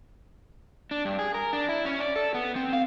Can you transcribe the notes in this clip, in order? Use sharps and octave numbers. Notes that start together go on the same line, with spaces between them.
D4
G2
G#4
A#4
D4
E4
C#4
D5
A4
B3
C4
F5